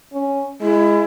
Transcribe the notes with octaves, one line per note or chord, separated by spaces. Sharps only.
C#4
G#3 E4